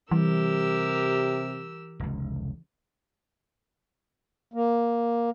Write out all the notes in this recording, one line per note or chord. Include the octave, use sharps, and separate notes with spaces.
C3 E3 G3 G4 A#4 E6
F1 C#2
A#3